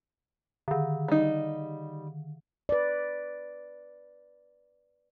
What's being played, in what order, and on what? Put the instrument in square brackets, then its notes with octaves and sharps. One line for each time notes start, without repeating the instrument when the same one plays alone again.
[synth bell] D3 D#3
[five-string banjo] G3 D#4
[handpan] B4 D5